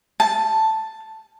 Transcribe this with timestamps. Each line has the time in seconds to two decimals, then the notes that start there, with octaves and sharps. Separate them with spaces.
0.20 A5